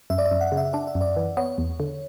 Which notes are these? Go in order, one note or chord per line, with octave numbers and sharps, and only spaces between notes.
F#2 E5
D5
E5
F#2
F#5
C#3
E5
D4 D5
E5
F#2
D5
E3
B3 C#5
E2
D3